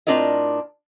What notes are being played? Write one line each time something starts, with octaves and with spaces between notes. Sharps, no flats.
A2 C4 D4 F4 A#4 D#5